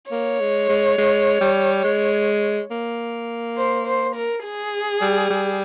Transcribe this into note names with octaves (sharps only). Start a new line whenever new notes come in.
A#3 C#5
G#3
G#3
G#3
G3
G#3
A#3
C5
C5
A#4
G#4
G3
G3